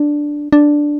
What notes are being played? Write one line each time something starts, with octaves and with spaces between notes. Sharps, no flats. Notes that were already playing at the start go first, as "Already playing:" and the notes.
Already playing: D4
D4